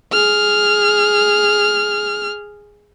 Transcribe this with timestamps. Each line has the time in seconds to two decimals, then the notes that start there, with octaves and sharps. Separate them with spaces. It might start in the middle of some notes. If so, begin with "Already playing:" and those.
0.12 G#4 F6